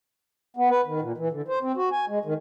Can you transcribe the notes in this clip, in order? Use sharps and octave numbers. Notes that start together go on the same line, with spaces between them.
B3
B4
D#3
A#2
E3
D3
C5
C4
F#4
G#5
G#3
D#3